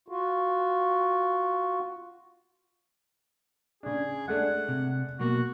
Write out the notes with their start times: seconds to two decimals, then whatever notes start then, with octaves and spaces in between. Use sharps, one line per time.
0.08 F4 F#4
3.83 C#3 D4 G#4
4.28 G#3 A3 D4 F#5
4.68 C3
5.19 B2 F#3 A#3 F#4